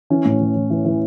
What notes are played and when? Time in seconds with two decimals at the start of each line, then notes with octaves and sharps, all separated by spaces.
0.10 E3 C#4
0.25 A2
0.40 E3
0.55 E3
0.70 E3
0.85 E3